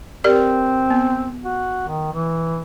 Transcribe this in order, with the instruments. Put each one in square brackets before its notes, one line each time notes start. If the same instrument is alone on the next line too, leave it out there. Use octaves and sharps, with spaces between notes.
[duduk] C4 [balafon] G4 A#4 D5
[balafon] B3
[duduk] F#4
D#3
E3